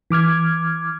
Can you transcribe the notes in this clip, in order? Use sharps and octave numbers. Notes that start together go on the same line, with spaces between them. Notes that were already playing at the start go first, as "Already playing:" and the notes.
E3 D6 F6 G#6